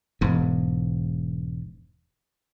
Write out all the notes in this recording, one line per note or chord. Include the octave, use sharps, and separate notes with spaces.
E1 G#2